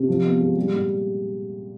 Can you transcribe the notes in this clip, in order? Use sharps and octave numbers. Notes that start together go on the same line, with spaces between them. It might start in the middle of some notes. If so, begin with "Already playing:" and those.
Already playing: C3
F3
B3
G#3
G3
A#2